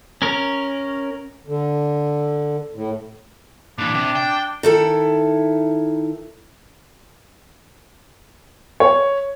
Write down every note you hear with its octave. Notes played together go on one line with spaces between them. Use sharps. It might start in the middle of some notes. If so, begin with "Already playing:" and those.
C#4 A#4
D3
A2
A#2 E3 D4
C3
G5
D#3 E4 A4
C#5